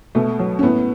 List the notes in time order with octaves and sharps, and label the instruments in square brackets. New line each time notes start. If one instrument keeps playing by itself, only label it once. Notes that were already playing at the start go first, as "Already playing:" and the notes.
[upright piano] B2 A3
F#3
C#4
A2 B3